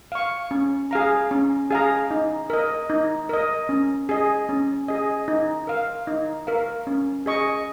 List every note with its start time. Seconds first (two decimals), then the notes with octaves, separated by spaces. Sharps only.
0.12 F5 C#6
0.51 C#4
0.91 G#4 F5 A#5
1.31 C#4
1.71 G#4 F5 A#5
2.11 D#4
2.50 A#4 D#5
2.90 D#4
3.29 A#4 D#5
3.69 C#4
4.09 G#4 D#5
4.49 C#4
4.88 G#4 D#5
5.28 D#4
5.67 A#4 F5
6.07 D#4
6.47 A#4 F5
6.87 C#4
7.26 G#4 D#5 C#6